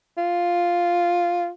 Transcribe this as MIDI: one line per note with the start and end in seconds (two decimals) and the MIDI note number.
0.18 1.49 65